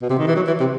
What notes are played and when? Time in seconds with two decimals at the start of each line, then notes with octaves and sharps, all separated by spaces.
0.02 B2
0.10 C3
0.18 D#3
0.27 E3
0.36 F#3
0.47 E3
0.60 C3